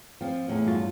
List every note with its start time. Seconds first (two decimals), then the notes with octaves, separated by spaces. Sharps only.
0.21 F3 C4
0.48 E2 A2
0.67 G2 F4 F#4